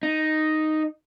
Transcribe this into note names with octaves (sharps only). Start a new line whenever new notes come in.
D#4